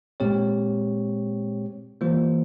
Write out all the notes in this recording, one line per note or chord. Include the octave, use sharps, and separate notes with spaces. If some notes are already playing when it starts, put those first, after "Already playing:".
A#2 G#3 C4 G4 C#5
E3 G3 A#3 F4 C5